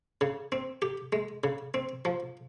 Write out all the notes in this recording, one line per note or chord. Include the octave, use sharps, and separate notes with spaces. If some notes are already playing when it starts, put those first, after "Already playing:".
C#3
C4
G4
G#3
C#3
C4
F3